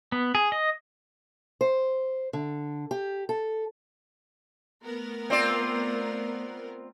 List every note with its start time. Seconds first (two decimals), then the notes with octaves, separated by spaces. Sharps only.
0.12 B3
0.35 G#4
0.52 D#5
1.61 C5
2.33 D3
2.91 G4
3.29 A4
4.85 A3 B3 A#4
5.30 C4 F4 D5